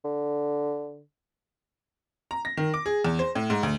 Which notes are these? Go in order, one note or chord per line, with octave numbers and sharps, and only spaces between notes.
D3
A#5
A#6
D#3
D6
G#4
E2
C5
A2
G#2
D2